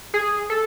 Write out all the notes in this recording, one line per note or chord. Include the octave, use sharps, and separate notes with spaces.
G#4
A4